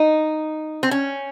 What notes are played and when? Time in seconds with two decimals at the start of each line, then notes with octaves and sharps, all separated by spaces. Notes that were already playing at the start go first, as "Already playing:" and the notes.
Already playing: D#4
0.83 C4
0.91 C#4